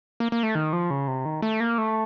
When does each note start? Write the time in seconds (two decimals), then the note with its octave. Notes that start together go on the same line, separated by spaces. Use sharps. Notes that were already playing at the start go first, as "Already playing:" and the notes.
0.20 A#3
0.32 A#3
0.43 A3
0.55 D#3
0.73 F3
0.90 C#3
1.08 C3
1.25 D#3
1.42 A3
1.60 A#3
1.78 A3